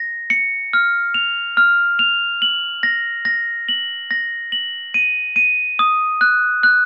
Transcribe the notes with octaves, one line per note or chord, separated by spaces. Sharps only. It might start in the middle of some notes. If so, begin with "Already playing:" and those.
Already playing: A#6
C#7
F6
F7
F6
F7
F#7
A#6
A#6
F#7
A#6
F#7
D#7
D#7
D#6
F#6
F#6